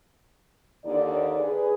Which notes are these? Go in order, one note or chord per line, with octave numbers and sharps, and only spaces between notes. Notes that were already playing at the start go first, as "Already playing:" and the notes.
D#2 D3 D#4 D5
G#4 B4